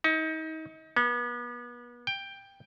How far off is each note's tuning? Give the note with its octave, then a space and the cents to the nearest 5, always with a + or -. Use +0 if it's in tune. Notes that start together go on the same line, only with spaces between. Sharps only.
D#4 +30
B3 -35
G5 +10